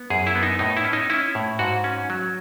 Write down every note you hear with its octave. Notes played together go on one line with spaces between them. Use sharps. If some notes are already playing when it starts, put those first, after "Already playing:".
Already playing: B3
F#2 G#4
E4
B3
D#4
A2 D#4
E4
C#4
D#4
C#4 E4
A2
G#2 F#4
C#4
F#3